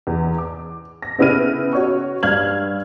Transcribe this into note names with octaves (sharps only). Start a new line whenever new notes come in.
E2
D6
A#6
C#3 B3 E4 B4 F6 D#7
F#4 C#5 C#6
G2 F5 F6 G#6 F#7